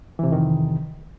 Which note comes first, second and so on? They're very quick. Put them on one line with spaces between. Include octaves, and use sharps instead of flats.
E3 C3 F2 D#3